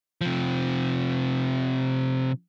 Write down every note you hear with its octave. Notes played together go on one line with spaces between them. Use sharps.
C3 F3